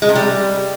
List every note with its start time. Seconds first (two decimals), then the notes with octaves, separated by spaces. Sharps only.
0.02 G#3
0.09 C3
0.15 G3